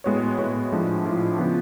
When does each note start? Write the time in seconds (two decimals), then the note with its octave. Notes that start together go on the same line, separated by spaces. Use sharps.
0.04 A2 G#3 B3 F#4 C#5
0.38 A2 G#3 B3 F#4 C#5
0.72 A2 F3 G#3 D4
1.05 A2 F3 G#3 D4
1.39 C#3 F3 B3